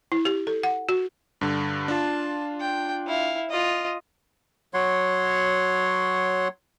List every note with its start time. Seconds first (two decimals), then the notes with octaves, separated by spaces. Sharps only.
0.12 E4
0.25 G4
0.47 A4
0.63 F#5
0.89 F#4
1.41 G2 D3
1.88 D4 F4 A5
2.60 G5
3.07 E4 F5
3.50 F4 D#5
4.74 F#3 C#5 F#5 C6